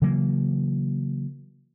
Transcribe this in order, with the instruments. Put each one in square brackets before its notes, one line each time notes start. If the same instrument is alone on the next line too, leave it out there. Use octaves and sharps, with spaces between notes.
[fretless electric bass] C#3 E3 F#3 A#3